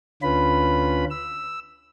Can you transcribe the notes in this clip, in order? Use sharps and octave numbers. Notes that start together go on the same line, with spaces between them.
D2 D3 C#4 F4 B4 B5
E6